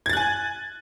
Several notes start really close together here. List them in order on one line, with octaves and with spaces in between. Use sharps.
G#6 A6 F#6 G#5